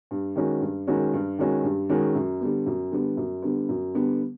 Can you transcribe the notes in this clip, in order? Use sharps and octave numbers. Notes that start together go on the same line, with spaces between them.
G2
D#3 G#3 C#4 F#4
G2
D#3 G#3 C#4 F#4
G2
D#3 G#3 C#4 F#4
G2
D#3 G#3 C#4 F#4
F#2
D3 G3 B3
F#2
D3 G3 B3
F#2
D3 G3 B3
F#2
D3 G3 B3